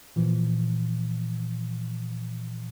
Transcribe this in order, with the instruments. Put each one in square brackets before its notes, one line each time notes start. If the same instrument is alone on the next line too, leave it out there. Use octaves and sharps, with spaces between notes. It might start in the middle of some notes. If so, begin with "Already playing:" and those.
[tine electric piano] A#2 E3 F3